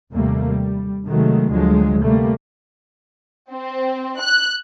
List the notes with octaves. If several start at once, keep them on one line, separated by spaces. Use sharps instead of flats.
D#2 C3 G3 A3 A#3
G3
C3 D#3 F#3 G#3 A3
D2 D3 F3 F#3 G#3
C3 G3 A3 A#3
C4
F#6